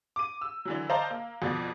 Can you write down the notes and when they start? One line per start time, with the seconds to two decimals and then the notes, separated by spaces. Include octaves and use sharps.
0.16 D6 D#7
0.41 E6
0.65 D3 E3 F#3
0.90 C5 D5 D#5 F5 A5 A#5
1.10 A#3
1.42 F2 B2 D5 A6